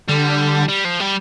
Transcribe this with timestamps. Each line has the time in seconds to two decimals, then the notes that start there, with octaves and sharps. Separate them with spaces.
0.09 D3 G3
0.69 G3
0.85 F3
1.00 G3